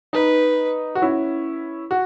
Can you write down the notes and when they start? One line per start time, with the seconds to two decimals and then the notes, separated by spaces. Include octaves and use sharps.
0.13 D#4 B4
0.95 F#4
1.02 C#4 E4
1.91 F#4